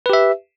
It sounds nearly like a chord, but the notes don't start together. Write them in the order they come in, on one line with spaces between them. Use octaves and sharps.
B4 G4 E5